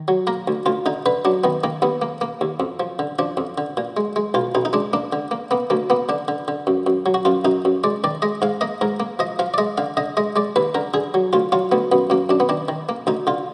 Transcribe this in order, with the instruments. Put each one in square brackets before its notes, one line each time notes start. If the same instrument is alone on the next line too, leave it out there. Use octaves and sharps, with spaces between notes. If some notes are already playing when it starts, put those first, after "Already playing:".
Already playing: [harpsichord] D#3
F#3
A#3 A#4
D2
D2 F4
D3 D#4
D3 B4
F#3 D4
D#3 B3
D#3 A#3
D#2 B3
A#3
A#3
D#2
F2
F3
D3
F3 D4
F2
D3
A#2
G#3
G#3
B1 F4
B1 D#4
D#4
G#3 D4
A#3 D4
D3
A#3
A#3 B3
D2 A#3
A#3 B3
D3 D4
D3
D3
F#2
F#2
F#3
F#4
F#2 F4
F#2 D#4
F#2
G#3 D5
D#3 D5
G#3 D#5
G#2 F5
A#3 D#5
G#2 A#4
A#3
F3 D#5
F3 F5
D5
G#3 D#5
D3 F5
D3 D#5
G#3 D#5
G#3 D5
D#2 B4
D3 A#4
D3 G#4
F#3
D2 F4
F#3 F4
D2 B3
F#2 B3
F#2 A#3
F#2 D4
B3
D#3 D4
D#3
A#3
D2 D#4
D3 F4